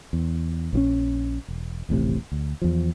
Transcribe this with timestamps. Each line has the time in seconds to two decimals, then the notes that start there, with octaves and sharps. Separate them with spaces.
0.13 E2
0.73 A#1 E3 C#4
1.48 E1
1.89 D#1 A1 A2 C3
2.32 D2
2.62 E2 F3